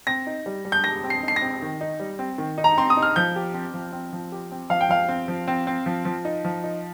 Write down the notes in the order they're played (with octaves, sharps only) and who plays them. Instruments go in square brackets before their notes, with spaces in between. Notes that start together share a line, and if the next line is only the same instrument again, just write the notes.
[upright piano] C4 [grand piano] A#6
[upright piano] D#4
G3
G3
[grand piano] G6
[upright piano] G3 [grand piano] A#6
[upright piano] C4
[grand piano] C7
[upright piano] D#4 [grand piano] C7
[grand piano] A#6
[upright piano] C4
D#3
D#4
G3
C4
D#3
D#4
[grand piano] A#5
[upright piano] C4 [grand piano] C6
[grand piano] D#6
[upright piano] D#4
[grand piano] F6
[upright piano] F3 [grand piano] G6
[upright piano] G4
C4
F3
C4
F3
G4
C4
[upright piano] F3 [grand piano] F5
[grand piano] G5
[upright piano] F3 [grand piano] F5
[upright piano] C4
F3
C4
C4
F3
F3
D#4
F3
D#4